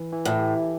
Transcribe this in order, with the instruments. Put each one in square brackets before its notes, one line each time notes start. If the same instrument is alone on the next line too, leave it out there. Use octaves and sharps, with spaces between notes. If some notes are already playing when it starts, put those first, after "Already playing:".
Already playing: [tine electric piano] E3
E3
[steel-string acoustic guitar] A2
[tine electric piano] G4